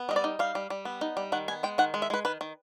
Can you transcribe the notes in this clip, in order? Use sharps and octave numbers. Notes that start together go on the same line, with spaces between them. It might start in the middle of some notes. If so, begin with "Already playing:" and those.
Already playing: B3
G3 D#5
D5
D#4
G3 F5
G3
G3
B3
D#4
G3
D#3 F#5
B3 G#5
G#3 G5
D#3 F#5
G#3
E5
G#3 B4
D#3 B4
D#3